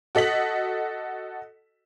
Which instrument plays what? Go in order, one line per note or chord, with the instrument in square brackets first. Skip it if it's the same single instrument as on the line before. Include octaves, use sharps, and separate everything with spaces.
[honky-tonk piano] F#4 A4 D#5 B6 F#7